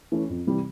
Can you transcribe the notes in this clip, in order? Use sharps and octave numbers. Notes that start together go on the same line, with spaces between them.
E3 A3 C#4
F2
C3 E3 G3